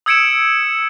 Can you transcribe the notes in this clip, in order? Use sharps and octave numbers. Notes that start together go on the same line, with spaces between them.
D#6 E6 G#6 C#7 D7 E7